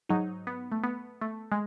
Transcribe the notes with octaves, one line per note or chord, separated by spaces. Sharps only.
G#2 F#3 D#4
B3
A3
B3
A3
G#3